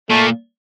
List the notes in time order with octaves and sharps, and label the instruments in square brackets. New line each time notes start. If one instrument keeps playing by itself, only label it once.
[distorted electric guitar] A#2 [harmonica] A3